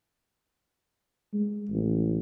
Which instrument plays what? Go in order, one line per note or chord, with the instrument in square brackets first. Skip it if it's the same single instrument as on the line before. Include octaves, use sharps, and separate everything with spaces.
[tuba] G#3
A1